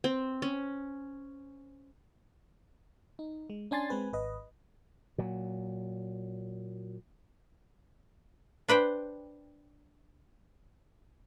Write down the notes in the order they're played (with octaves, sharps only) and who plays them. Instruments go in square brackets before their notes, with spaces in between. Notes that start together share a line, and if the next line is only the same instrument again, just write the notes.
[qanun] C4
C#4
[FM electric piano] D#4
G#3
C#4 D4 G#5 C6 A6
G#3 C4 B4 G#5
G#1 B4 D#5
[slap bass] A#2 F#3
[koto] D4 B4 C5 G5